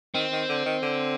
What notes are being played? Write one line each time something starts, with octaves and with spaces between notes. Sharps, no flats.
D#3 C4
D#3
D3
D#3
D3